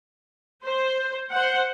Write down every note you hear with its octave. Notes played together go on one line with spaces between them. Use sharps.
C5
C5 F#5